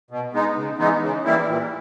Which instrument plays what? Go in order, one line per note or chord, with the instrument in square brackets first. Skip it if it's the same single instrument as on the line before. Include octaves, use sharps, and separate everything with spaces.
[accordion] B2
G#3 B3 D#4
C#3
E3 G#3 B3 D#4
C#3
E3 G3 A#3 E4
A#2